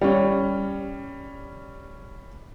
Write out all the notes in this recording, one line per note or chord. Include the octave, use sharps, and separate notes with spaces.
G3 C#4